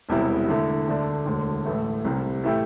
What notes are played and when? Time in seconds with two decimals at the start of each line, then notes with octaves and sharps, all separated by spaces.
0.09 E1 E2 C3 G3 E4
0.49 D3 A3 E4
0.88 D2 D3 A3 D4
1.26 E1 D2 D3
1.65 A1 A2 E3 A3
2.05 C2 C3 G3
2.43 A2 E3 A3 E4 G4